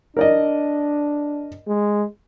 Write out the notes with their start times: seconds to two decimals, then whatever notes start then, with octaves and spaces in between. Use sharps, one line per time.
0.17 D4 A#4 D5 D#5
1.67 G#3